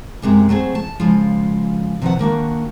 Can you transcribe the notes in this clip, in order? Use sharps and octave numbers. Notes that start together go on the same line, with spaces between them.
F#2 C3 G#3 A3
F#3 A3 C4 G#4
A5
C#3 F3 G#3 F4
C3 D#3 F3 A4 B4 F#5
D#3 A#3 D4 F#4